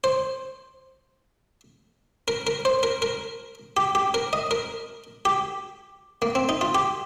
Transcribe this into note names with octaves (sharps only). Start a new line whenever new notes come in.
C5
A#4
A#4
C5
A#4
A#4
G4
G4
A#4
D#5
A#4
G4
A#3
C4
D#4
F4
G4